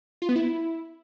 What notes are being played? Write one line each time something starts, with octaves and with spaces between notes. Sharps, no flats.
F4
B3
E4